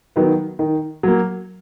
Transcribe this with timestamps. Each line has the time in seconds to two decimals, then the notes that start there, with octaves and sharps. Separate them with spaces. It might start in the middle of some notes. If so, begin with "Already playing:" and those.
0.16 D#3 F#3 B3
0.59 D#3
1.03 F#3 A#3